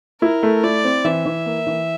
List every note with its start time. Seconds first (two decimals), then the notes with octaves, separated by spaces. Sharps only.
0.22 E4 A#4
0.43 A3
0.64 E4 D5
0.84 C4
1.05 E3 E5
1.25 E3
1.46 A#3
1.67 E3